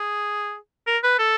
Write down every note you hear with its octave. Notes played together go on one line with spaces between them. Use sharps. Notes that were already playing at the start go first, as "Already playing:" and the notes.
Already playing: G#4
A#4
B4
A4